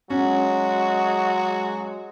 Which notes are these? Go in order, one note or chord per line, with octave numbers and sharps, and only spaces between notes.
F#3 G#3 C#4 F#4